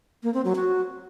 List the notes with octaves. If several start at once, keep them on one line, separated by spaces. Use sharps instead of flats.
A#3
C4
F#3
F#4